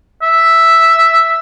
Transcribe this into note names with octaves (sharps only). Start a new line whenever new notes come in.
E5